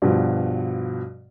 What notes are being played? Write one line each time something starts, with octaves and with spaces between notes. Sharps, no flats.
G2 B2 F3